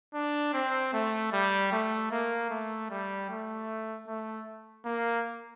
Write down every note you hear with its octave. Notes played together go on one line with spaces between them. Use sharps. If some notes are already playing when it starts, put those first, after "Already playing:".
D4
C4
A3
G3
A3
A#3
A3
G3
A3
A3
A#3